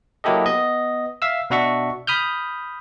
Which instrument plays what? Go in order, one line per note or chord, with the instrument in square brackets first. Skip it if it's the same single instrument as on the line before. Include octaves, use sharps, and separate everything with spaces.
[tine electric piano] F#3 A#3 E4 G4 A4 D#5
B3 D#5
E5 F5 E6
B2 D4 F#4 E5 C#6
B5 D#6 F6 G6